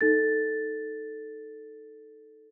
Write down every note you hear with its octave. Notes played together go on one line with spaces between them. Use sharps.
D#4 A4 A6